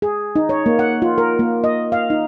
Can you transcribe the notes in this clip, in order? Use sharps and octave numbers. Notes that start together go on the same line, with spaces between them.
G#4
D#4
C#5
A#3
F#5
F4
A#4
A#3
D#5
F5
D#4